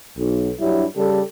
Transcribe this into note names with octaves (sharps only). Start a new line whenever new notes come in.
B1
G2 F#3 G3 D4 E4
C#3 G3 G4 A4